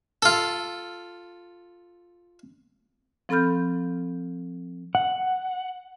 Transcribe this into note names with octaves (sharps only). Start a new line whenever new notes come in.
F4 A4
F3 C4 A4 B5 F6 G6
F#5